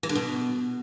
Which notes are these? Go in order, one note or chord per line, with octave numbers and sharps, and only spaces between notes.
E3
D3
B2